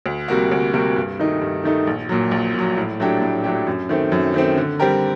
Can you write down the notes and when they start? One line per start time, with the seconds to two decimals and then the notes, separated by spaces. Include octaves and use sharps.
0.06 D2
0.28 C3 G3 A#3 F#4
0.52 D2
0.73 C3 G3 A#3 F#4
0.96 G2
1.19 D#3 A3 D#4
1.41 G2
1.64 D#3 A3 D#4
1.87 A#1
2.09 A#2 F#3
2.31 A#1
2.54 A#2 F#3
2.77 A2
3.00 F#3 A3 D4 G4
3.22 A2
3.44 F#3 A3 D4 G4
3.67 F#2
3.89 D#3 A3 C4
4.12 F#2
4.34 D#3 A3 C4
4.57 D3
4.79 G3 C4 G4 A#4